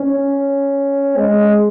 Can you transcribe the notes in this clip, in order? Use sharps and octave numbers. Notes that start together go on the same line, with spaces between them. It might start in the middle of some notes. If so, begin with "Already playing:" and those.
Already playing: C#4
G#3